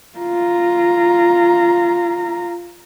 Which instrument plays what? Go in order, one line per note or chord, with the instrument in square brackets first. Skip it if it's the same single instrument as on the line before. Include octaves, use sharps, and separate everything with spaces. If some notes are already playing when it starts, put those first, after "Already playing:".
[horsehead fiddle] F4 A#5